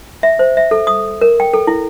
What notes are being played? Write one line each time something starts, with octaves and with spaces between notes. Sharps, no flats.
E5
C5
E5
A4
D#6
A#4
G5
A4
E4